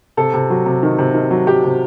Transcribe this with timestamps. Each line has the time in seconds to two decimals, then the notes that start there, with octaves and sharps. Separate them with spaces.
0.17 C3 A4
0.34 C3
0.50 F#3
0.66 C3
0.83 D#3
0.98 C3
1.14 D#3
1.31 F#3
1.47 F#3 G4
1.64 C3